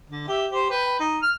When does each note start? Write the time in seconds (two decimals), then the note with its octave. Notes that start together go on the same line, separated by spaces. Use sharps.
0.10 D3
0.28 G4 E5
0.52 G4 C5
0.70 B4 G5
1.00 D#4
1.22 F6